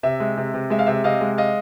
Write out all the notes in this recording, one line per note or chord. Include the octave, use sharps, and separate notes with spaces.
C3 E5
G#3
C3
C3
G#3 E5
F5
C3 E5
C3 D#5 F5
G#3
D#5 F5